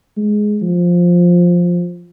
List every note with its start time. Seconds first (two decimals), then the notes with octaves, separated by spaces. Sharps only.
0.17 G#3
0.62 F3